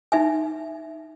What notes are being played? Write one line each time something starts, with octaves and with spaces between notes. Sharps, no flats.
D#4 E5 G#5